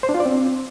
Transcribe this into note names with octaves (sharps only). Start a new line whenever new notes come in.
C5
D4
F4
D5
C4